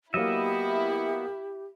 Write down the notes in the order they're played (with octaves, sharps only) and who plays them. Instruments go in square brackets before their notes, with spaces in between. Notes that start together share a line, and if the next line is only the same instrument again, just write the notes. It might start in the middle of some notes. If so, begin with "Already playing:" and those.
[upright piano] F#3 A#3 [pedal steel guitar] B3 D#5 E5 [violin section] E4 [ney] G4